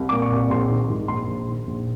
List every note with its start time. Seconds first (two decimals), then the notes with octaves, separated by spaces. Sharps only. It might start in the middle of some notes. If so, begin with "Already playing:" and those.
Already playing: C2
0.09 A#2 D6
0.22 C#6
0.32 C2
0.50 A#1 C6
0.69 D#3
0.90 G#2
1.08 A#1 C6
1.27 A#1
1.48 D#3
1.67 A#1